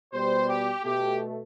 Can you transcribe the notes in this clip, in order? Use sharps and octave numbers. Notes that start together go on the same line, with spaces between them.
B2 G3 C5
G4
B2 A3 G4